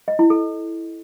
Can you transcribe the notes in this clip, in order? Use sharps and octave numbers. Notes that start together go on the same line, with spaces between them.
D#5
E4
A4